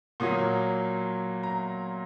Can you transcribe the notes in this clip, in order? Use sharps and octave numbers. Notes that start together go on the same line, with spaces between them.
A#2 F#3 A#3 D#6
A#5